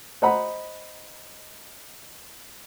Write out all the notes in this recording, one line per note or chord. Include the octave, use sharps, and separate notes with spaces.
C5 D#5 F#5 A#5 B5